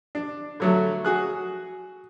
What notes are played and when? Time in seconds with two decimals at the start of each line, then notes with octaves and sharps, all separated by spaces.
0.15 D4
0.60 D3 F#3 A3
1.05 F#4 G#4 F#6